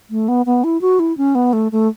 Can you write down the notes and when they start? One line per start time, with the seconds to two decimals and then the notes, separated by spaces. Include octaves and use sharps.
0.10 A3
0.28 B3
0.46 B3
0.64 E4
0.81 F#4
0.99 E4
1.18 C#4
1.35 B3
1.53 A3
1.72 A3